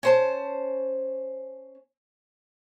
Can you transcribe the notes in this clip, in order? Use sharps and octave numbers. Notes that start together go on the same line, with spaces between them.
C#4 C5 A5